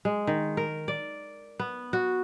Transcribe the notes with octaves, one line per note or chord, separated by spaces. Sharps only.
G#3
D#3
A#4
D5
B3
F#4